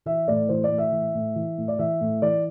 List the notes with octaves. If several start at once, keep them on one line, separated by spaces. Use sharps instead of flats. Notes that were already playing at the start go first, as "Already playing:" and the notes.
E3 E5
A2 D5
E3 C5
D5
A2
E5
E3
A2
E3
A2
D5
E3 E5
A2
E3 D5